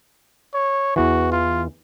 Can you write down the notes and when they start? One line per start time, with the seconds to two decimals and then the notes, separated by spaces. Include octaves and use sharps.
0.54 C#5
0.96 E2 E3 F#4
1.32 F4